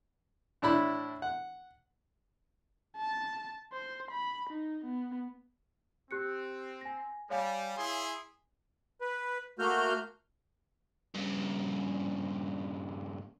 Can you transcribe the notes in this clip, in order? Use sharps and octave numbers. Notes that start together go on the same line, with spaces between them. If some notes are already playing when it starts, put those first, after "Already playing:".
A2 D4 E4 B5
F#5
A5
C5
B5
D#4
B3
C4 G4 F#6 C#7
G#5 A#6
G3 C#5 F5 G#5
E4 G#4 C6
B4
A3 A#3 F#4 F6 G6
G2 C#3